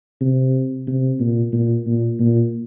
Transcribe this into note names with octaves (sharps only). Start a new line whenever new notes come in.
C3
C3
A#2
A#2
A#2
A#2